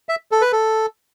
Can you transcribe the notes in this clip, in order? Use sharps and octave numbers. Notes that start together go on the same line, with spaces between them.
E5
A4
B4
A4